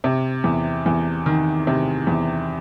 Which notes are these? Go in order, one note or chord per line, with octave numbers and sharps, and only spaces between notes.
C3
E2
E2
D#3
C3
E2